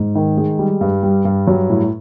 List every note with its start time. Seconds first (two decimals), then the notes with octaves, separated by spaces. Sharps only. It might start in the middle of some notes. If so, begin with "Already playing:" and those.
Already playing: G#2
0.15 D#3
0.37 G#3
0.59 G3
0.81 G2
1.03 G3
1.25 G2
1.47 F#3
1.70 A2